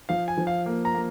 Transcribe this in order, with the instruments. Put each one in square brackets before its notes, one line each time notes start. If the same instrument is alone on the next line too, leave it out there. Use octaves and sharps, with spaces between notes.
[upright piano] F3 [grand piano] F5
[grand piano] G#5
[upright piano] F3
[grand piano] F5
[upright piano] A#3
[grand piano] A#5
[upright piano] A#3